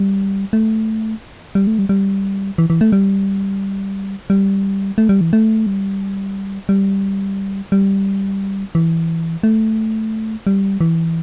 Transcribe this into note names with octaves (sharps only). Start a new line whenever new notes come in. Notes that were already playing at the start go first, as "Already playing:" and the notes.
Already playing: G3
A3
G3
A3
G3
G3
E3
E3
A3
G3
G3
A3
G3
E3
A3
G3
G3
G3
E3
A3
G3
E3